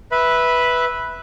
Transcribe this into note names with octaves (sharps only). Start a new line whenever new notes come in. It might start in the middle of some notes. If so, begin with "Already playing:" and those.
B4 E5 B5